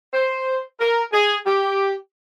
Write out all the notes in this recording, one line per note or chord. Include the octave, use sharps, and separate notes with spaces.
C5
A#4
G#4
G4